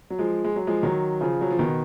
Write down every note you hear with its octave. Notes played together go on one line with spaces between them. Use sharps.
F#3
F3 G#3
G#3
F#3
F3 G#3
D#3 F#3
C#3 F3
F#3
F3
B2 D#3